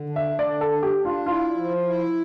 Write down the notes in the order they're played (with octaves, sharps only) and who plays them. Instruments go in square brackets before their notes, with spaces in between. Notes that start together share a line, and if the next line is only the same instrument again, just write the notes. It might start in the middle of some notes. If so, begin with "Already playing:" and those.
Already playing: [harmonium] D3
D4
[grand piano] E5
[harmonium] D3 [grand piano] D5
[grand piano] A4
[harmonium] D4
[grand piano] G4
[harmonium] D4
[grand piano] F4
[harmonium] E4 [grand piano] F4
[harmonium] F3
E4